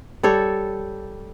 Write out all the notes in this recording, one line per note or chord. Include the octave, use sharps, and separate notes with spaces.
G3 A4 C#5